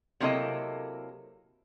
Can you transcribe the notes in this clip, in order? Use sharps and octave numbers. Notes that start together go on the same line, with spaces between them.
C3 F#3 A#3 E4 A4 D#5